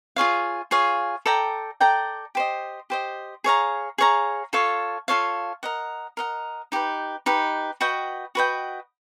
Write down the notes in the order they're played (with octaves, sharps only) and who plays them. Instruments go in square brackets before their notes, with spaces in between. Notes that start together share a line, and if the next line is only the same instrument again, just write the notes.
[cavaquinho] F4 G#4 C#5 F5
F4 G#4 C#5 F5
A4 D5 G5 A#5
A4 D5 G5 A#5
G4 C5 D#5
G4 C5 D#5
G#4 C#5 F5 A#5
G#4 C#5 F5 A#5
F4 A4 C#5 F5
F4 A4 C#5 F5
A#4 D#5 F#5
A#4 D#5 F#5
D#4 G4 B4
D#4 G4 B4
F#4 B4 D#5 G5
F#4 B4 D#5 G5